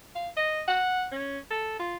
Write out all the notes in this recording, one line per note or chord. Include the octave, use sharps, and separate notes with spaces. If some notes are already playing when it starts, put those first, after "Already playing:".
F5
D#5
F#5
C#4
A4
F4